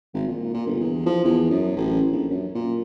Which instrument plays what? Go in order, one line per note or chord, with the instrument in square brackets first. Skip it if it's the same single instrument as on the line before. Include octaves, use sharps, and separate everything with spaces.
[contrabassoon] G#1
A#2
A#2
G1
E2
F3
E2
F#2
A1
A#1
F#2
A#2